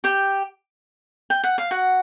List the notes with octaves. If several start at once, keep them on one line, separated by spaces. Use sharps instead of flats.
G4 G5
G5
F#5
F5
F#4 F#5